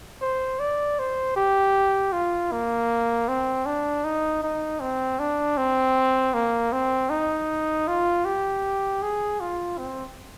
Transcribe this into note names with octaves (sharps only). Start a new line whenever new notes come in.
C5
D5
C5
G4
F4
A#3
C4
D4
D#4
D#4
C4
D4
C4
A#3
C4
D#4
F4
G4
G#4
F4
C4